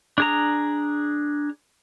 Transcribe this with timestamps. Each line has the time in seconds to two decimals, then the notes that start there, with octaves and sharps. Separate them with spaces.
0.18 D4 G#4 A#5